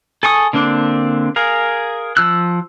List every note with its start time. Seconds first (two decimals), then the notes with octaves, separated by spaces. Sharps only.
0.23 A4 G#5 C#6 D#6
0.53 D3 A#3 C4 D4
1.36 G#4 A#4 F5
2.17 F3 E6 F#6